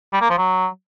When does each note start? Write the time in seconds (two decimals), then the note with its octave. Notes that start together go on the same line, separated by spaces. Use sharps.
0.13 G3
0.21 A#3
0.30 F3
0.38 F#3